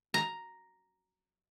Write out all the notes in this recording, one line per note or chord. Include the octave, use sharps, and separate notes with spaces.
A#5